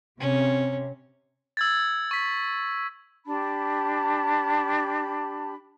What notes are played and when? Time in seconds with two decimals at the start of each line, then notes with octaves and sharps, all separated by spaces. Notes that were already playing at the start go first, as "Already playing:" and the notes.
0.20 C3 C#4
1.57 E6 G#6 A6
2.11 C#6 B6
3.26 D4 G4 A5 B5